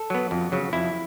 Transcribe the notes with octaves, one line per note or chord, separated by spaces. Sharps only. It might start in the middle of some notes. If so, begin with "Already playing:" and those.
Already playing: A4
F#3 B3
F2
C#3 F#3
F2 E4